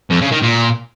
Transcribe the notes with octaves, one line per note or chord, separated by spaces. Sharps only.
F2
C#3
D#3
A#2